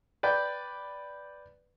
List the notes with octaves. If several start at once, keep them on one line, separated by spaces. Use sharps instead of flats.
B4 D5 G5